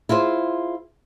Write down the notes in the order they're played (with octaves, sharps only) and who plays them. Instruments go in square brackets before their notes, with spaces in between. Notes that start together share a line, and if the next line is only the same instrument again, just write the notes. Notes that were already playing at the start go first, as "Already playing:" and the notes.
[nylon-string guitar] E4 F4 G#4 C5